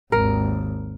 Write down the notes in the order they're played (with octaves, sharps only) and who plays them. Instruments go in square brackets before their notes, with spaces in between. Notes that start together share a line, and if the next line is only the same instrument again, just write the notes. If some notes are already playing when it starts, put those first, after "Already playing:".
[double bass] G#1 D#2 [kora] A#4